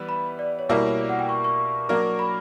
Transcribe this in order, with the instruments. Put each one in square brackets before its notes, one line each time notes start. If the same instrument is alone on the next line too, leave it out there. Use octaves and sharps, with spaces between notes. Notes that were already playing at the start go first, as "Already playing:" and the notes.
Already playing: [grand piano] E3 G3 B3 E4 B4
[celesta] B5
D5
C#5
[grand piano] B2 G3 A#3 E4 A#4 [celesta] D5
[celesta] C#5
D5
F#5
G5
C#6
C#6
[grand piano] F#3 A#3 D4 A#4
[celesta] B5